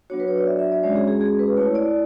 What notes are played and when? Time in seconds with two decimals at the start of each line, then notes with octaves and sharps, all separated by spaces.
0.10 F#3 B3 D4 F#4 C#5
0.20 B4
0.28 C#5
0.38 D5
0.47 E5
0.59 E5
0.72 D5
0.83 G#3 C#4 F#4 C#5
0.96 G#4
1.08 G#4
1.21 G#4
1.39 B4
1.57 A3 E4 C#5
1.75 D5